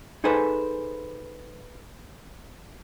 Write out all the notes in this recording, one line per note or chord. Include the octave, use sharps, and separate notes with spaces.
D#4 G#4 A4 B4 C5 G#5